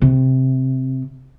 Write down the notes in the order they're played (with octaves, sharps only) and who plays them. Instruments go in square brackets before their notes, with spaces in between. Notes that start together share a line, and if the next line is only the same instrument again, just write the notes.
[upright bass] C3